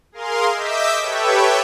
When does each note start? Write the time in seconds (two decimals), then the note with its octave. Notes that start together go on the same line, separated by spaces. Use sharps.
0.12 G#4 A#4 F5 C6
0.53 D#5 E5 D6 E6 G6 B6
1.00 G4 A4 B4 C#5 E5 G5